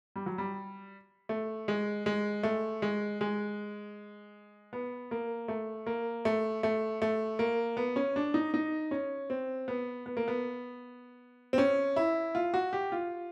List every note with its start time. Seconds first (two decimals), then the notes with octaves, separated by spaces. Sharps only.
0.16 G3
0.26 F#3
0.38 G3
1.29 A3
1.68 G#3
2.06 G#3
2.43 A3
2.82 G#3
3.21 G#3
4.73 B3
5.11 A#3
5.48 A3
5.86 A#3
6.25 A3
6.63 A3
7.02 A3
7.39 A#3
7.77 B3
7.96 C#4
8.16 D4
8.34 D#4
8.54 D#4
8.91 C#4
9.30 C4
9.68 B3
10.06 B3
10.17 A#3
10.28 B3
11.53 C4
11.58 C#4
11.96 E4
12.35 F4
12.54 F#4
12.73 G4
12.92 F4